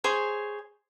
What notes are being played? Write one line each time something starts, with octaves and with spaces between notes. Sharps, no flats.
G#4 C5 C#5